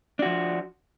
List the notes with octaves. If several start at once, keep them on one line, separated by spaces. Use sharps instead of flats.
F3 D4 F#4